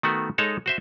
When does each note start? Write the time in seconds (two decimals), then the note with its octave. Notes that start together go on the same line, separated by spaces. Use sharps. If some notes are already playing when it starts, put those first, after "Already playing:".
0.03 D#3 A3 B3 F#4
0.38 G#3 D#4 A4 C#5 A5
0.66 F#4 C5 E5